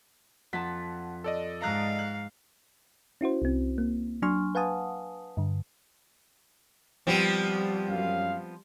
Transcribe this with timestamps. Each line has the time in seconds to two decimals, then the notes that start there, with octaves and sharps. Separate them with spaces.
0.53 F2 F#5 A5 B6
1.24 A4 D5 D#5
1.61 G#2 F5 A#5 F#6
1.99 F#6
3.21 C#4 E4 F#4 C5
3.42 C2 C4
3.78 A#3
4.22 F#3 D4 G#5 C6 C#6 F6
4.55 B4 F5 F#5 G#5 A5 D#6
5.37 G2 D3
7.07 F3 G3 B3 C4
7.88 F#2 F5